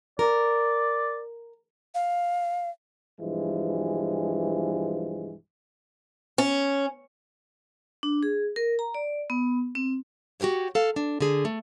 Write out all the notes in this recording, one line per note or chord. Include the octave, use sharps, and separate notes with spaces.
A#4 D5
F5
B1 G2 E3 F3 G#3
C#4
D4
G#4
A#4
A#5
D5
B3
C4
F#4 G4 A#4 C5 C#5
A4 F5
D4
D3 G#4
A3